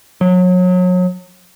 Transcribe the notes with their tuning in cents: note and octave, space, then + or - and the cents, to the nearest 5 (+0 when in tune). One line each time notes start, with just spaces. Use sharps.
F#3 -30